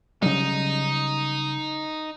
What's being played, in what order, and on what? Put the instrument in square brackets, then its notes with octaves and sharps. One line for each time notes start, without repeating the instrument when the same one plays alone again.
[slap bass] C#3 F#3 G3 [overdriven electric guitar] D#4